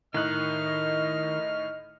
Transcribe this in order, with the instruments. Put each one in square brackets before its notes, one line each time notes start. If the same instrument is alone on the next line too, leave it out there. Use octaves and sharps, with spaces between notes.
[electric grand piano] A2 D#4 [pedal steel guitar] D#3 F#6 [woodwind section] D#5 [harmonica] F6